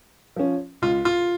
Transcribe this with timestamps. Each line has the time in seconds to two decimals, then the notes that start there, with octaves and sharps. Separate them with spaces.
0.36 F3 C#4
0.82 C#2 F4
1.05 F4